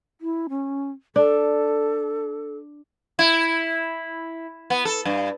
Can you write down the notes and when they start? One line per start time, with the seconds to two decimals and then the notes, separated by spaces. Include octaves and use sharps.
0.21 E4
0.49 C#4
1.16 D4 A4
3.19 E4
4.70 B3
4.85 A4
5.05 G2